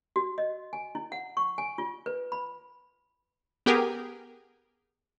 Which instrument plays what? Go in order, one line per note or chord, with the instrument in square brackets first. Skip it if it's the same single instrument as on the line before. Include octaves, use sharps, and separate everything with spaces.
[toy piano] F#4
D#5
G#5
E4
F#5
C#6
G#5
F4
B4
B5
[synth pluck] B3 G4 G#4 A#4